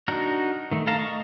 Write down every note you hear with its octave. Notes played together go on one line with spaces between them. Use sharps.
D4 D#4 F#4 A#4
D#3 A3
A4 F5 A5 A#5
D#5 C#6